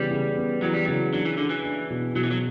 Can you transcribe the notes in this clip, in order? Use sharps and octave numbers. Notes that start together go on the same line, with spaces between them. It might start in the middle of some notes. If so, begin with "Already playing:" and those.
Already playing: C#3 E3 G3 B3
C#3
B3
E3 F#3
G3
C#3 F#3
F#3 D4
E3
D3 D4
E3
D4
B2
B2 F#3
E3
F#3